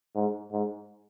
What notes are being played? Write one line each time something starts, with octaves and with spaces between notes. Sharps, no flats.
G#2
G#2